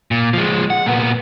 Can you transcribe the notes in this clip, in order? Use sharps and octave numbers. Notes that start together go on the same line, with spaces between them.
A#2
F3 G#3
F#5
A#2 B3